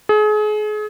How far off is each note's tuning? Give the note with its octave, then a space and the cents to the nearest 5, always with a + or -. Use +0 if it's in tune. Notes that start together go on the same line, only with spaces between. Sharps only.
G#4 +35